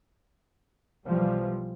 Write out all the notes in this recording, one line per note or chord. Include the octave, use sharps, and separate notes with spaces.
B1 E3 F3 G3